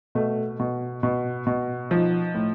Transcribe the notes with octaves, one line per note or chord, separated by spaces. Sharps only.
B2 A3
B2
B2
B2
F3 D#4
A2